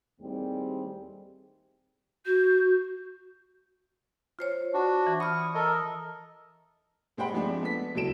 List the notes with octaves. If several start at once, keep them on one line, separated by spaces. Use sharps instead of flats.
D#2 A2 G3 C4 G#4
F#4 G6
F4 C5 C#5
D4 F#4
E3
B5 C#6 D#6 F6
A4 A#4 D#5
G2 G#3 C5 F#5 G5 B5
F3 G#3 A3 C4 D4
B3 A4 B6
C#2 F#3 E4 A4 D7 E7